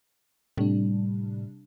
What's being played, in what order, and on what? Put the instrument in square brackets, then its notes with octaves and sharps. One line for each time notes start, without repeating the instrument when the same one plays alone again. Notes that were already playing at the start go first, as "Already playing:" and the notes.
[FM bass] A2 [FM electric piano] C3 G3 D4